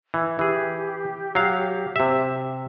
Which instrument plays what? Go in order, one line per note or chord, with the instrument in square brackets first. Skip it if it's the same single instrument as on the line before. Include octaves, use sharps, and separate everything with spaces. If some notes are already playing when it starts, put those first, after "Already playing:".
[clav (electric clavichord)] E3
[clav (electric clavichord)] E3 G#4 [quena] G4
[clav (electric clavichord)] F#3 F5
C3 E5